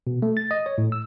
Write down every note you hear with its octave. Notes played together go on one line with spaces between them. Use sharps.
B2
A3
A6
D#5
C#5
A2
E6